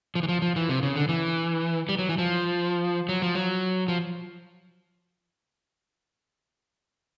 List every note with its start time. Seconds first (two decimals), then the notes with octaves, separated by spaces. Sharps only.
0.15 F3
0.23 E3
0.29 F3
0.42 F3
0.56 E3
0.69 C3
0.83 C#3
0.96 D3
1.09 E3
1.89 G3
1.99 F#3
2.09 E3
2.18 F3
3.09 F#3
3.22 F3
3.35 F#3
3.88 F3